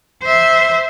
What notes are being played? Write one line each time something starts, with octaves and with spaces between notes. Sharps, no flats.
C5 E5